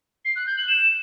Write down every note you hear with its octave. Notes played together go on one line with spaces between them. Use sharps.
C7
F#6
G6
F#7
E7